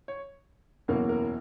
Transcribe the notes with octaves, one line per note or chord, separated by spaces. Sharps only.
C#5
F#1 E2 B2 A#3 C#4 A#4
A#4